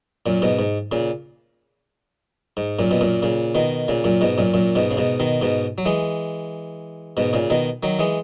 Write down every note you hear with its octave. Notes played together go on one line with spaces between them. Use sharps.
F#2 A#2
G#2 B2
G#2
A#2 C#3
G#2
F#2 A#2
B2
F#2 A#2
A#2 C#3
B2 D#3
A#2 C#3
F#2 A#2
G#2 B2
F#2 A#2
F#2 A#2
G#2 B2
C#3
G#2 B2
B2 D#3
G#2 B2
F#3
E3 G#3
G#2 B2
A#2 C#3
B2 D#3
D#3 F#3
E3 G#3